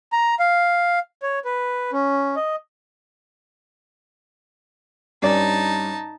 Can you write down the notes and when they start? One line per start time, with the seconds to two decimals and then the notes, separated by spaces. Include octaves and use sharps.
0.12 A#5
0.39 F5
1.22 C#5
1.45 B4
1.92 C#4
2.36 D#5
5.22 G2 C#4 D#4 D5 A5